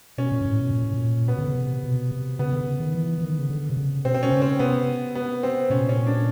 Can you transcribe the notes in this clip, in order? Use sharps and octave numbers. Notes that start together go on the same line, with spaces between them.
B2 C#4
A#2
G#2
A2
B2
A#2
A2
A#2
B2 B3
D3
C#3
C3
B2
C3
C#3 B3
D3
C3
C#3
D#3
E3
E3
D#3
C#3
D3
C3
C#3
B2 C4
C4
C#4
C#3
C4
C3 B3
B3
C4
A#2 C#4
C#4
D4